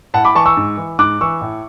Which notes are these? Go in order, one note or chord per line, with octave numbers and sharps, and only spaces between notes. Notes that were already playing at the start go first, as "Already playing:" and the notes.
A2 F#5 A5
B5 D6
E3 A5 C#6
C#6 E6
G#2
E3
G#2 D6 F#6
E3 C#6 E6
A2